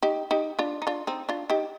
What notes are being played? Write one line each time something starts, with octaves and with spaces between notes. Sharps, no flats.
D#4 G4
D#4 G4
D4 F4
D#4
D4 F4
C4 D#4
D4 F4
D#4 G4